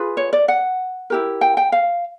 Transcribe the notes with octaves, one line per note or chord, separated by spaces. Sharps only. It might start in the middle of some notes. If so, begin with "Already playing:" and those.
Already playing: F4 G#4 B4
C#5
D5
F#5
E4 G4 A#4
G5
G5
F5